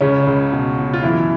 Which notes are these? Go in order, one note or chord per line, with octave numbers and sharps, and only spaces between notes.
C#2 C#3 C#4
C#2
B2
B2
F4
F#2 E3 E4